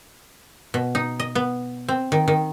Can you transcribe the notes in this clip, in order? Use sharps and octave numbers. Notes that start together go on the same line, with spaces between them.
B2
D#4
D#5
B3
C4
D#3
D#3